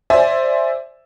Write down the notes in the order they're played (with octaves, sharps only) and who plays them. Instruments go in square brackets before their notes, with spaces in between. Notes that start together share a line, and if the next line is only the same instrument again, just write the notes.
[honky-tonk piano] C5 D5 E5 G#5